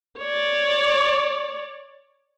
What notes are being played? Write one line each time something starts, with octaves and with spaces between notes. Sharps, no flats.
C#5 D5